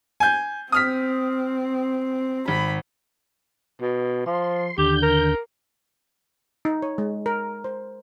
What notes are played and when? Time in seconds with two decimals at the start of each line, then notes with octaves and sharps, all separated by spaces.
0.20 G#5 G6
0.72 C4 D#6 F6 B6
2.48 G#1 B5
3.81 B2
4.26 F3 C6
4.78 D#2 D3 G4 G6
5.02 A#4
6.65 D#4
6.82 C#5
6.98 G#3
7.26 A#4
7.64 C5